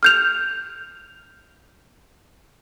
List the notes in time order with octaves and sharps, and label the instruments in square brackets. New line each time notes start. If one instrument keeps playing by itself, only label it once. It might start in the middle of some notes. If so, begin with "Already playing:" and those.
[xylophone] F6 G6 F7